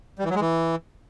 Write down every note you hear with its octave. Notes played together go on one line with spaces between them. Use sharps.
G3
E3
F#3
G#3
E3